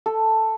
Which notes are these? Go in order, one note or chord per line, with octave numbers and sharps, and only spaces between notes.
A4